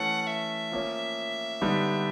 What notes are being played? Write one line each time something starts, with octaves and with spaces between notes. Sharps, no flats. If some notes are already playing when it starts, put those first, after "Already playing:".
Already playing: E3 A3 C#4 F#5
E5
F3 A#3 C#4
D3 G3 B3 D#4